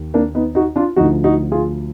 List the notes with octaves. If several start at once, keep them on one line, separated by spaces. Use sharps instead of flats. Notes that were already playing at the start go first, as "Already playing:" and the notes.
Already playing: D#2 D#3
A#3 D4
B3 D#4
D#4 F#4
D4 F4
D2 D3 F3 D#4 F#4
D#4 F#4
F4 G#4